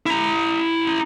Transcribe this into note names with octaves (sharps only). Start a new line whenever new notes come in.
E4 A#5